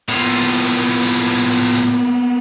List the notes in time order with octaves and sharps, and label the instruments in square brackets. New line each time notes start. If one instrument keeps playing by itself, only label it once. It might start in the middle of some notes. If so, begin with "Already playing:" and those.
[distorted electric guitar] A2 F3 [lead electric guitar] A#3 B3